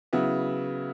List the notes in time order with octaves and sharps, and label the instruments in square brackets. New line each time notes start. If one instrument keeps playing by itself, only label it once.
[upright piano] C#3 F#3 B3 E4